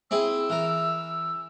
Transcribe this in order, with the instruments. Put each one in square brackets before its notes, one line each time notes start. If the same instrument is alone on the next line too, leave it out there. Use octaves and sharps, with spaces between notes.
[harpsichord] C4 E4 G#4 [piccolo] E6
[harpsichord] E3 A#4